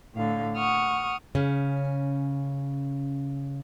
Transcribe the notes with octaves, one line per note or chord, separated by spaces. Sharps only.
A2 D3 F5
F#5 C#6 D#6 F6
C#3 C#4